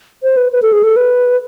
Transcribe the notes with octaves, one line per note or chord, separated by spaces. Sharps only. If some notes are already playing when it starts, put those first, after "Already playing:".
C5
B4
B4
A4
G#4
A4
B4